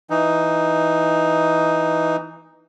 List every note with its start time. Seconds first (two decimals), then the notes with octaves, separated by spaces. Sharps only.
0.10 E3 D#4